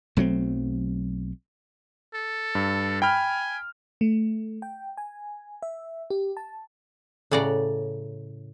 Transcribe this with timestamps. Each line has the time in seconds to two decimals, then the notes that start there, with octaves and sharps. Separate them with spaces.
0.17 B1 F#3 A3 C4
2.15 A4
2.55 G2
3.02 G5 G#5 B5 F6
4.01 A3
4.62 G5
4.97 G#5
5.62 E5
6.10 G4
6.37 A5
7.31 A2 C#3 D5 F#5 A#5